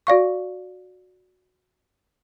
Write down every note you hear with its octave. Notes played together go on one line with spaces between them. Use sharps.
F#4 D5 F5 C#6